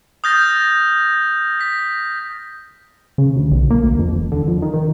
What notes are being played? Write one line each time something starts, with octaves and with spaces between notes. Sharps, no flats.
D#6 F6 G6 A6 A#6
A#6 B6
C#3
D2
B1
A#3
D2
F2
E1
D3
F2
D#3
D#3